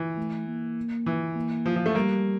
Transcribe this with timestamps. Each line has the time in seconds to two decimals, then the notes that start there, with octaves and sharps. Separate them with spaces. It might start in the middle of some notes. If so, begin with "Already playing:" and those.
Already playing: E3
0.17 A3
0.48 A#3
1.06 E3
1.35 A#3
1.66 F3
1.76 F3
1.86 A3
1.95 G3 A#3